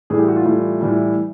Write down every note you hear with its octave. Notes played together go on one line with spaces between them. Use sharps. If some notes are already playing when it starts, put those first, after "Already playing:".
A2 E3 G3 G#4
G4
F#4
F4
A2 E3 G3
A2 E3 G3